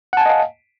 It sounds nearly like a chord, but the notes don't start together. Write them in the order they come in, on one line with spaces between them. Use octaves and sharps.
F#5 A5 G#5 D#5 F5